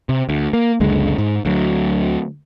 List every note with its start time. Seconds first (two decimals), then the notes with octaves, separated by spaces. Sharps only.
0.09 C3
0.29 D2
0.53 A#3
0.80 F#1 C#2 D3 G#3
1.18 G#2
1.45 D2 F#3